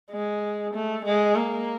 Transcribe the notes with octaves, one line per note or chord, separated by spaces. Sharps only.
G#3
A3
G#3
A#3